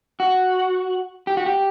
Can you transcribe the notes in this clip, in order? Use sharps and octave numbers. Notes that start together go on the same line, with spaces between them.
F#4
G4
F#4
G4